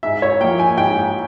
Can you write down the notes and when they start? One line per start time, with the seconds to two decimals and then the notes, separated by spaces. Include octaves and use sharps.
0.03 G#2 E5
0.22 C#5
0.41 F3 A#3 G5
0.59 G#5
0.77 G#2 G5